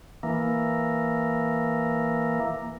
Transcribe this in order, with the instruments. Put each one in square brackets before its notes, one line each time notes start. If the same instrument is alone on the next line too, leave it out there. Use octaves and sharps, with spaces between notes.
[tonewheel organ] E3 A#3